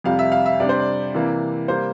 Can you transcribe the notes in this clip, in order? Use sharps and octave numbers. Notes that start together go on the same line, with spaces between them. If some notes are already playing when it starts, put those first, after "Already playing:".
F2 C3 G3 F5
E5
F5
E5
C3 G3 D4 D5
C5
D5
C3 E3 A#3 E4
C3 G3 A#3 C5